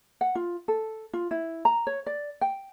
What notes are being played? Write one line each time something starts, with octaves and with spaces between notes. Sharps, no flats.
F#5
F4
A4
F4
E4
A#5
C#5
D5
G5